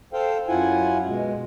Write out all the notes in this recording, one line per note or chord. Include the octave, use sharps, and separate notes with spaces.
A4 C5 F5 G5
F#2 E4 F4 F#5 G#5
B2 G#3